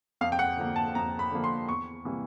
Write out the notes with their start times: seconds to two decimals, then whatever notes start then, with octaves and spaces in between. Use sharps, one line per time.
0.21 F2 F5
0.32 G5
0.39 F#5
0.57 D3 F3 A#3
0.76 A5
0.95 F2 A#5
1.19 B5
1.31 D3 F3 A#3
1.44 C6
1.69 E2 C#6
2.05 C3 E3 G3 A#3